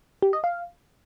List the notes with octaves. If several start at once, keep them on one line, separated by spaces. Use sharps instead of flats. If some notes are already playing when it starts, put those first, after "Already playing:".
G4
D#5
F5